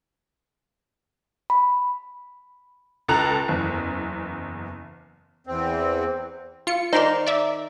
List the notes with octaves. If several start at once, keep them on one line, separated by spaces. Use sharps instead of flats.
B5
C#2 A4 A#5 F#6 F7
F#1 E2
E2 C4
F4 C#7
D#3 D#4 C5 D5 C6
D5 E5 D6